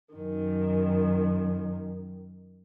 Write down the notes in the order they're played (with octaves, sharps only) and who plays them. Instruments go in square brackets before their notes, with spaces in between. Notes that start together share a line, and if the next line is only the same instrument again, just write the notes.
[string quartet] F#2 D#3